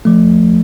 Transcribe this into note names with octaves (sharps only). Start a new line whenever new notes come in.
F3 A3